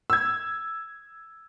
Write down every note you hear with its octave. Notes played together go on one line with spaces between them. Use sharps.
E6 G#6